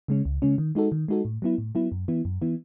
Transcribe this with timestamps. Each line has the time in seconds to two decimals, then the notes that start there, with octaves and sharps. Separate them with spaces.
0.08 C#3 G#3 C#4
0.25 C#2
0.42 C#3 G#3 C#4
0.58 D#3
0.75 G#3 D#4 F#4 A4
0.92 D#3
1.08 G#3 D#4 F#4 A4
1.25 A2
1.42 F#3 B3 E4
1.58 A2
1.75 F#3 B3 E4
1.92 F#2
2.08 E3 B3 E4
2.25 F#2
2.42 E3 B3 E4